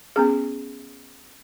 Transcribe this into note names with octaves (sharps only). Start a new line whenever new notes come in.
B3 C#4 G#4